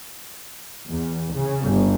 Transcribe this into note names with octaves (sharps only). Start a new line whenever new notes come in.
E2
C#3
G1